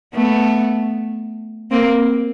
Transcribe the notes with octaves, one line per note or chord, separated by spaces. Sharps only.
A3 B3
A#3 C4